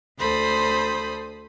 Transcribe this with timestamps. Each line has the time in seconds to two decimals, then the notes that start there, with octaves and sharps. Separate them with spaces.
0.19 D2 A4 C5 B5 D#6